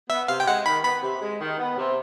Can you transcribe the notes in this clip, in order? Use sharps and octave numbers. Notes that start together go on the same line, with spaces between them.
B3 E5
C3 F5
G5
G#3 F#5
D#3 B5
B3 B5
C3
G#3
D#3
B3
C3